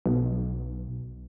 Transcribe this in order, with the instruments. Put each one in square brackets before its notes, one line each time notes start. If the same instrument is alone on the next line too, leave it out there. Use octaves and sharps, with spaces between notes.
[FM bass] B1